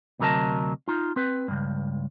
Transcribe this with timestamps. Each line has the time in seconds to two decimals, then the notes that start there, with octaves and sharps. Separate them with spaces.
0.19 D2 C3 F#3 A#4 D#5 A5
0.88 D#4 F4
1.16 C4 B4
1.48 C#2 G2